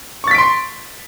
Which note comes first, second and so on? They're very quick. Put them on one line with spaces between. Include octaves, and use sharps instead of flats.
C#6 A6 B6 D7 C6